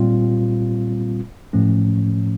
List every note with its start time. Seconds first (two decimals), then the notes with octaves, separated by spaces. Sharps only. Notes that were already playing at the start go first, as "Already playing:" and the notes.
Already playing: A#2 G3 C4 F4
1.53 A2 F3 A3 C#4